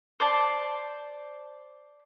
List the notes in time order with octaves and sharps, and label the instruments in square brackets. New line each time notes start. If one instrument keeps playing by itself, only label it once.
[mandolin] C5 D5 A5